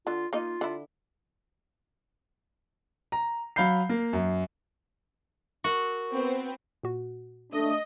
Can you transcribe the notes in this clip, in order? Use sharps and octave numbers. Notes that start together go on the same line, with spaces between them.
D3 F4
A#3 D#4 F4 D#5
D3 E4
A#5
F#3 F5 B5 G6 C7
A#3
F#2
F#4 A#4 C#6
B3 C4
A#2 F#4
A3 D4 D#5